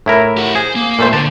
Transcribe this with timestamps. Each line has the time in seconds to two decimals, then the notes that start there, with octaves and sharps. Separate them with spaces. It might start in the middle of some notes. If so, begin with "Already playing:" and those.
0.06 A2 E4 A#4
0.37 G4 F#5
0.55 G#4 C5
0.75 A#3
0.99 A#2 A3 C5
1.13 D3 A5